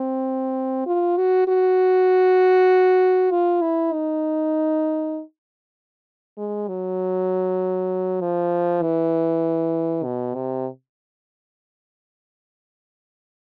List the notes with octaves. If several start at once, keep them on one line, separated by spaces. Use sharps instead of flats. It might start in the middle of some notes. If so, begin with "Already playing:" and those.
Already playing: C4
F4
F#4
F#4
F4
E4
D#4
G#3
F#3
F3
E3
B2
C3